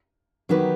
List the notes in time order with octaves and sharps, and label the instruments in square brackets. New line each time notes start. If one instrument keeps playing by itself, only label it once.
[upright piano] D#3 [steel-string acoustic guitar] F#3 B3 D#4 G4 B4